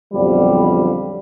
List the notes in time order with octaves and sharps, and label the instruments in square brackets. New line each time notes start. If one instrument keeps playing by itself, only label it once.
[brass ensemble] B1 F2 D3 F3 G3